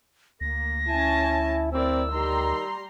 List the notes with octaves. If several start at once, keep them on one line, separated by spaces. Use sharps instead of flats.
D2 A#3 A#6
C#4 E4 G#5 A5
C4 E4 A#4 D5 E6
D#3 G3 A#5 C6